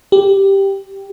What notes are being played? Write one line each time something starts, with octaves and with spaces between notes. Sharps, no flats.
G4